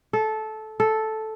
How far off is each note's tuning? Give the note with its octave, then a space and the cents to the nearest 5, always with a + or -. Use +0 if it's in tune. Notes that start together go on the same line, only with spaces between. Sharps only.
A4 -15
A4 -5